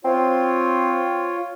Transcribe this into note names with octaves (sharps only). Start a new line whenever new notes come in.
C4 F4 C#5